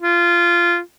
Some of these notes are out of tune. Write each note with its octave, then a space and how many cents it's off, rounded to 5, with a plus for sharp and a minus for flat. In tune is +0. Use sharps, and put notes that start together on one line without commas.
F4 -15